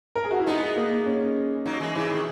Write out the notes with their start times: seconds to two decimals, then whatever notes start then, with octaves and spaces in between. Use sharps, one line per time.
0.15 A#4
0.24 G#4
0.31 F#4
0.40 E4
0.47 G#3 B3 D#4
0.76 A#3
1.06 C#4
1.66 F#3 A#3 D#4
1.80 E3 G#3
1.95 C#3 E3 E4
2.10 B2 D#3